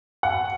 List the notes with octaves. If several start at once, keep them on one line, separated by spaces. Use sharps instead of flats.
F#5